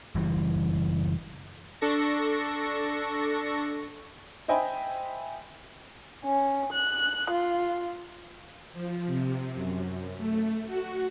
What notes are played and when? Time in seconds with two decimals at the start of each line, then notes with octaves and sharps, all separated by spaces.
0.15 F#1 E3 G3
1.81 D4 A4 C#6 A#6
4.48 C5 D#5 E5 G5 G#5 B5
6.25 C#4
6.72 F#6
7.30 F4
8.73 F3
9.07 C3
9.55 F#2
10.18 A3
10.67 F#4